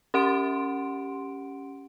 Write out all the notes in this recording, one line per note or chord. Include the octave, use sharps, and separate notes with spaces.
C#4 G4 F#5 C6 D7